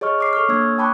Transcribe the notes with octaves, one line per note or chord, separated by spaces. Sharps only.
G#4 C#5 D#5 C#6 F6
C#5 D6 C7
A4 C#6 F6
A#3 D4 C#5 E6 G#6
D#6
G5 A5 B5 C#6 D6 F#6